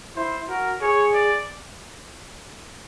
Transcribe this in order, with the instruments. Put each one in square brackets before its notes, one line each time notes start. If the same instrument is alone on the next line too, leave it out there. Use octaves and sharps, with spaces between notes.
[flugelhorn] E4 [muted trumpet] C5
[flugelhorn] F#4 [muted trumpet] A#4
[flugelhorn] G#4 [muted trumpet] C#5
[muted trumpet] D5